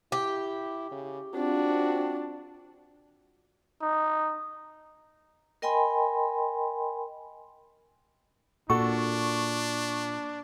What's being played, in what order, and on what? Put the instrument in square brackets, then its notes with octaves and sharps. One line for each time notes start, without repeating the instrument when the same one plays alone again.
[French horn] E4 [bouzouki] G4
[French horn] C#3
[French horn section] C4 F4 [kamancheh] D4 [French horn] F#4
[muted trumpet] D#4
[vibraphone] A#4 D#5 G5 G#5 B5 C6
[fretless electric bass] A#2 [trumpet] D4 [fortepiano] F#4 A4 F#5 [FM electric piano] C#6